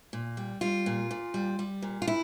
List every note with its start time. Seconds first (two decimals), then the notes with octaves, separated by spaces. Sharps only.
0.13 A#2
0.37 G3
0.61 G3 F4
0.86 A#2
1.11 A#2
1.34 G3
1.59 G3
1.82 A#2
2.02 F4
2.08 E4